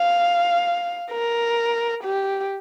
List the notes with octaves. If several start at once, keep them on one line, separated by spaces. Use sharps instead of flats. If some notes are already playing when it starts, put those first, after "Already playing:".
Already playing: F5
A#4
G4